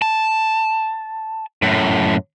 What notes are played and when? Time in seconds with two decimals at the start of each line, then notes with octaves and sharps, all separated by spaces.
0.02 A5
1.62 F#2 A2